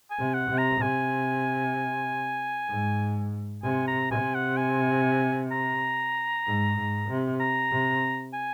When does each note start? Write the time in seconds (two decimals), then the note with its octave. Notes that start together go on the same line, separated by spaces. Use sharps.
0.10 G#5
0.19 C3
0.34 F#5
0.50 C3
0.58 A#5
0.81 C3 G#5
2.69 G#2
3.63 C3 G#5
3.88 A#5
4.10 C3 G#5
4.35 F#5
4.57 G#5
5.52 A#5
6.47 G#2
6.78 G#2
7.09 C3
7.40 A#5
7.72 C3
8.34 G#5